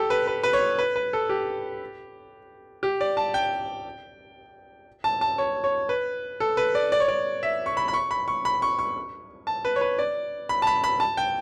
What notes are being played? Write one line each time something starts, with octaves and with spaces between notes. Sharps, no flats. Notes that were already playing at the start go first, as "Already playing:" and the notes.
Already playing: G4 A4
B4
B4
B4
C#5
B4
B4
A4
G4
G4
D5
A5
G5
A5
A5
C#5
C#5
B4
A4
B4
D5
D5
C#5
D5
E5
C#6
B5
B5
C#6
B5
C#6
B5
C#6
C#6
A5
B4
C#5
B4
D5
B5
A5
B5
B5
A5
G5